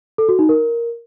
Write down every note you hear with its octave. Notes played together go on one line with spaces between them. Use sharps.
A4
F#4
D#4
A#4